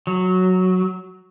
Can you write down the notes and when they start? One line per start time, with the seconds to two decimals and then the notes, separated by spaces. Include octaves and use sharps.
0.07 F#3